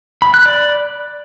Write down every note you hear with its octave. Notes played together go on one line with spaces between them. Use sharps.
B5
F#6
D5